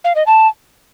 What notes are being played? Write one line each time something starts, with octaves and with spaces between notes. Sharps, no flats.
F5
D#5
A5